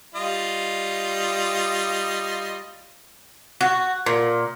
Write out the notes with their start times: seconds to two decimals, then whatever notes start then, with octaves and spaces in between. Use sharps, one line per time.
0.15 G3 F4 D#5
3.61 F#4
4.06 A#2